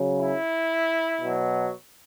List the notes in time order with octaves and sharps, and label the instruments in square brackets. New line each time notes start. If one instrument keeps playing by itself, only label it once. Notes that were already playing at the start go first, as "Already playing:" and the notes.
Already playing: [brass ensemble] C#3 F#3
E4
B2 F#3